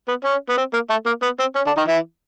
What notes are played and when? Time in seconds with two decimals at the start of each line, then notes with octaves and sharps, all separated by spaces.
0.08 B3
0.24 C#4
0.49 B3
0.57 C4
0.73 A#3
0.90 A3
1.06 A#3
1.22 B3
1.39 C4
1.55 C#4
1.66 D3 D4
1.77 D#3 D#4
1.87 E3 E4